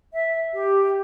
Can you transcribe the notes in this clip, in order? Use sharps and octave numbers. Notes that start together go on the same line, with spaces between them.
E5
G4